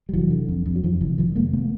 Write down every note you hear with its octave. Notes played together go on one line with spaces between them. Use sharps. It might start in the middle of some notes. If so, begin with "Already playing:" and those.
G3
F1 E3 F#3
D3
F2
F2
F#3
F2 D#3 F3
F1 D3 E3
F1 D#3 F3
F1 G#3 A#3
A3 B3